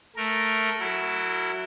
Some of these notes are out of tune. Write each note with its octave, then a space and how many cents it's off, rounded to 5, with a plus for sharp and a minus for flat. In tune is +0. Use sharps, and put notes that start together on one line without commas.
A3 +0 A#4 +0
F#3 +0 E4 +0 A#4 -40